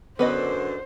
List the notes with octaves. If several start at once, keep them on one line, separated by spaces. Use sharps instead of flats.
F#2 D3 B3 B4 C5 D#5